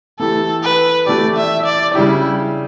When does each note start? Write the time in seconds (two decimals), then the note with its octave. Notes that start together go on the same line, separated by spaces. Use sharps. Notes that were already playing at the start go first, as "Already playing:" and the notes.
0.19 E3 A3 E4 G4 A4
0.63 B4
1.06 E3 A3 E4 G4 D5
1.36 E5
1.66 D5
1.95 C#3 G3 D4 E4 G4